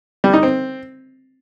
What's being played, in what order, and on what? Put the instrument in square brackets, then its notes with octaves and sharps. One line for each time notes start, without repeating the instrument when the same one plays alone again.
[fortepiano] G3
D#4
C4